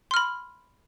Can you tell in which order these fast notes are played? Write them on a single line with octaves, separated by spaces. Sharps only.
C6 F6 B5